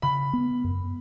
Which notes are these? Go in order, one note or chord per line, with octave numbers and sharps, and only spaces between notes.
C#3 B5
B3
F#2